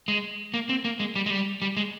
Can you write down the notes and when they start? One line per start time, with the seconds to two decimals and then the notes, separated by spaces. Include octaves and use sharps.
0.08 G#3
0.54 A#3
0.69 C4
0.85 A#3
1.00 G#3
1.16 G3
1.26 G#3
1.30 G3
1.62 G3
1.77 G#3